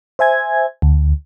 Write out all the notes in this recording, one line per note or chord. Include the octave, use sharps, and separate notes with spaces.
C5 E5 G#5 G#6
D2